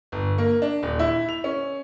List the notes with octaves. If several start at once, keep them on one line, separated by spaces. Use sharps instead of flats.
G1
A#3
D4
D#1
E4
F7
C#4